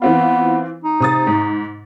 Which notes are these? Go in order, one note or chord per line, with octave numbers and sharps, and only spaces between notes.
E3 B3 C4 F4
D#4
C3 D#6 A6
G#2